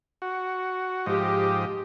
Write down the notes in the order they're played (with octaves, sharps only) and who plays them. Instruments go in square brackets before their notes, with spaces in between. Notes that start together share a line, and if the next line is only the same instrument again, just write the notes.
[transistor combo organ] F#4
[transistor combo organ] G#2 F3 D#5 [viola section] G4